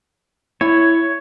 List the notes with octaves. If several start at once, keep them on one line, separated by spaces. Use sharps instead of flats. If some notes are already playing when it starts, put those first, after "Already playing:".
E4 C#5